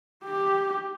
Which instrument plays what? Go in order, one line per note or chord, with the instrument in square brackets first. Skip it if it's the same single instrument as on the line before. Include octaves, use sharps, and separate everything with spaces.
[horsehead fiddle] G4